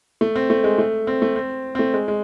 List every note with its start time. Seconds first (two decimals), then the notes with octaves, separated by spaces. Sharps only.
0.21 A3
0.36 C4
0.50 A3
0.64 G#3
0.78 A3
1.07 C4
1.22 A3
1.36 C4
1.75 C4
1.79 A3
1.94 G#3
2.08 G#3